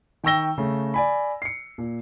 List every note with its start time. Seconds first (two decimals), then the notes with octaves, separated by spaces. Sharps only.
0.24 D#3 G5 C#6 E6 A#6 G7
0.58 C#3 A3
0.94 D5 G#5 B5
1.42 C7 C#7
1.78 A#2